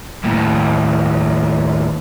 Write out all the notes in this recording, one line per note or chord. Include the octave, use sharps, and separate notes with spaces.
D#2 A2